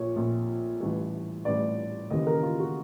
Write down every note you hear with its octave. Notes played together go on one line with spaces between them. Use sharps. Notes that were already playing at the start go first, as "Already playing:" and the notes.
Already playing: A#1 A#2 C#5
A#1 A#2
A1 G2 E3
A1 G2 E3 D5
D#2 C#3 E3 D#5
A#4
F4
F#4